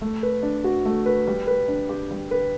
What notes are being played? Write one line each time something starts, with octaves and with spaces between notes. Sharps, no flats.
A3
B4
D4
F#4
A3
B4
G3
B4
D4
G4
G3
B4